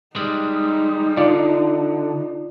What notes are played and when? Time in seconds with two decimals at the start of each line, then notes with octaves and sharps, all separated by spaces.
0.16 G3 G#3 D#4
1.17 D3 F4 D5